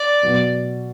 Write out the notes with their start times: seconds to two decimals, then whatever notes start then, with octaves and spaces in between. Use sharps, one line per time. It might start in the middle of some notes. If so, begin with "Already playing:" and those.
Already playing: D5
0.21 B2 F#3 B3